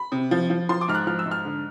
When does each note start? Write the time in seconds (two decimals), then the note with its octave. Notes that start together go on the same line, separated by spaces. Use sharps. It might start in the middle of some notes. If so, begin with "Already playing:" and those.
Already playing: B5
0.12 C3
0.31 F3
0.50 F3
0.69 F3 C6
0.81 D6
0.88 G#2 F6
0.95 F#6
1.07 F3 F6
1.19 E6
1.26 G#2
1.31 F6
1.45 D3